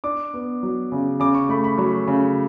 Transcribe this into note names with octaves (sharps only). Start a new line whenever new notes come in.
D4 D6
B3
F#3
C#3
C#3 D6
C#6
A3 B5
B5
F#3
C#3